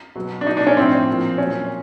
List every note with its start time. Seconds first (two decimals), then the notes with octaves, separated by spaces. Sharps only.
0.15 B2 F#3
0.41 D4
0.47 B2 F#3 D#4
0.57 D4
0.67 C#4
0.76 A2 F3 C4
1.08 A#2 F3
1.38 A#2 F#3 C#4